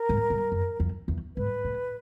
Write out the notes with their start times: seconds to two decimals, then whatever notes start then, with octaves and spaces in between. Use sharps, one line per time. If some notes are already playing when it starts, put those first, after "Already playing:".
Already playing: A#4
0.09 G#2
0.30 G2
0.52 F#2
0.80 F2
1.08 E2
1.37 G#2 B4
1.64 A2